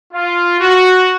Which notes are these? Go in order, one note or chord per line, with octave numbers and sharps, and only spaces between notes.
F4
F#4